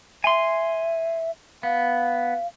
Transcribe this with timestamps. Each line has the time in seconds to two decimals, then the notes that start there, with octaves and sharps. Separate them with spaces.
0.24 E5 G#5 C6
1.63 B3 F5